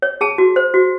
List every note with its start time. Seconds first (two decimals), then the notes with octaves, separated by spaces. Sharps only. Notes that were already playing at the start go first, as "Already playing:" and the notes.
0.02 C#5
0.21 G#4 A5
0.38 F#4
0.56 C5
0.74 F#4